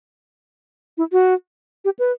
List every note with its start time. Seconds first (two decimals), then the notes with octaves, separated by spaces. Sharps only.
0.98 E4
1.12 F#4
1.85 G4
1.99 B4